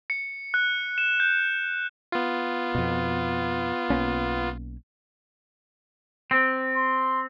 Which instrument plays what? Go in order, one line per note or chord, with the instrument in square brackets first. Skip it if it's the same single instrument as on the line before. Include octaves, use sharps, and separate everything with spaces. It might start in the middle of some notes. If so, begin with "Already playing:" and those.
[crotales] C#7
F#6
E7
G6
[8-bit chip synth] B3 F4
[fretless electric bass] F2 B2
B1 A#3 C#4
[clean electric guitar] C4
[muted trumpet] C6